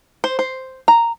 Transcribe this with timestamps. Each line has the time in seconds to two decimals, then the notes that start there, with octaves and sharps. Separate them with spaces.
0.24 C5
0.39 C5
0.88 A#5